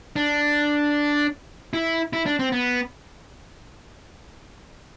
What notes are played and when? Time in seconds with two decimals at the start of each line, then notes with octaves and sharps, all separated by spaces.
0.16 D4
1.74 E4
2.13 E4
2.26 D4
2.39 C4
2.52 B3